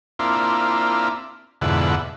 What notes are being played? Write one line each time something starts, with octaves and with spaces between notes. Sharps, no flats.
A#3 C4 D4 E4 F4
F2 G#2 B2 D3 E4 F#5